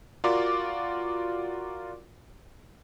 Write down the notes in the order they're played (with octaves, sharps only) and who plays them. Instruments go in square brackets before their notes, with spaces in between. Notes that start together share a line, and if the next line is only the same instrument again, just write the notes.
[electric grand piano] F4 F#4 A#4 D5 C6 D6